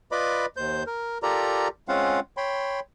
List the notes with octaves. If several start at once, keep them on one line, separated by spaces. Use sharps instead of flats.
F4 B4 D5 D#5 B5 D6
D#2 C5 G6
A#4
F4 G4 A4 A#4 D5 A#5
G#3 C4 C#4 F4 F5 F#5
C#5 G5 B5 C6